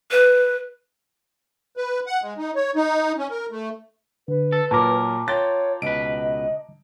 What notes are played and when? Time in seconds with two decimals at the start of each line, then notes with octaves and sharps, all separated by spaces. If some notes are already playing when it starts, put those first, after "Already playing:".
0.11 B4
1.77 B4
2.06 F#5
2.22 G#3
2.38 D#4
2.55 C#5
2.75 D#4
3.18 C#4
3.30 A#4
3.51 A3
4.28 D3 B4
4.52 A4
4.71 A#2 F#3 A#4 A5 A#5 D6
5.28 F4 A#4 C#5 G5 A6
5.82 C#2 B2 B4 D#5 D7